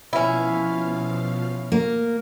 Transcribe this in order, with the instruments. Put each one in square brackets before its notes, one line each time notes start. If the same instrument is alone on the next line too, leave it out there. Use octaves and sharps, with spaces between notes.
[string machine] B2 F3 F5 [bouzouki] C#4 E4
[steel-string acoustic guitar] A#3